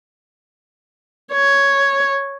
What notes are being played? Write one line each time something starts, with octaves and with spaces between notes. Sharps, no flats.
C#5